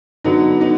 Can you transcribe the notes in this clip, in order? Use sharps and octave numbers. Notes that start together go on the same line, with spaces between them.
D3 F#3 B3 D#4
B3 D#4